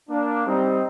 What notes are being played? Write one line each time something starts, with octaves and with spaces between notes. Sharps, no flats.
A#3 D4
G3 C4 D#4